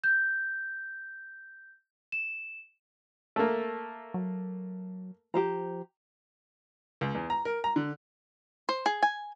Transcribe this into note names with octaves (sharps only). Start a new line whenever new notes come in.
G6
E7
A3 A#3
F#3
F3 G4 C5 A#5
C#2
E2
A#5
A#4
A#5
D3
C5
G#4
G#5